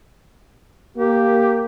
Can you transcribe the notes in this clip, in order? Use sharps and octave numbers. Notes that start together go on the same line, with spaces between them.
A#3 G4